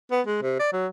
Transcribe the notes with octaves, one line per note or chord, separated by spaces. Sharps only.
B3
G#3
C3
D5
F#3